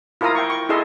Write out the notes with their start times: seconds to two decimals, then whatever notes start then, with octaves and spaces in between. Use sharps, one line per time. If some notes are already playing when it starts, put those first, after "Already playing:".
0.21 E4 F4 A#4 F5 A#5 D#6
0.35 G5 C#6
0.50 C#6
0.69 E4 G#4 A4 D#5 E5 C6